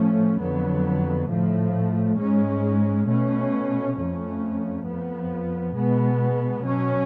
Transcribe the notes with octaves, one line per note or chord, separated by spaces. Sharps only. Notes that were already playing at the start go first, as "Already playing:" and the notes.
Already playing: A2 F3 A3 C#4
F2 D3 F#3 B3
A2 F3 A3
G#2 G#3 C#4
B2 A3 C#4
F2 F3 A3 C#4
F2 F3 B3
B2 G#3 B3
B2 F#3 C#4